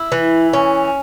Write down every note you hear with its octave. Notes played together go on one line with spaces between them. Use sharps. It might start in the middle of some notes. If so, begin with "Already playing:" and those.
Already playing: E4
E3
C#4